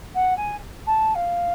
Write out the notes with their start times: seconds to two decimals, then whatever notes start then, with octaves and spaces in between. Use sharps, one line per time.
0.15 F#5
0.37 G#5
0.86 A5
1.15 F5